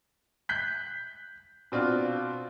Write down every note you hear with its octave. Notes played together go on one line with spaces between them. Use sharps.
F#6 G6 B6
B2 C4 D4 F4